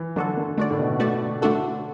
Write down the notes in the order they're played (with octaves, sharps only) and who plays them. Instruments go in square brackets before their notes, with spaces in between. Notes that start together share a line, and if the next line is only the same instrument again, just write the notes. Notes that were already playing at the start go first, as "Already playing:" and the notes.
Already playing: [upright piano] E3
[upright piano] D3 [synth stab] F#3 D4 F#4 A4
[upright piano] D3
[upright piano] D3 [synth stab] A3 F#4 D5
[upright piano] A2
B2
[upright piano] D3 [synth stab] A3 F#4 D5
[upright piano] D3 [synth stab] A3 D4 F#4 A4